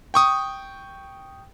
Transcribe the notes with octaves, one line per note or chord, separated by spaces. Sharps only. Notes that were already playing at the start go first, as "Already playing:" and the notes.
G5 C#6 D#6